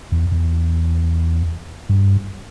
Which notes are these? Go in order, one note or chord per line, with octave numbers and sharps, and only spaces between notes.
E2
E2
G2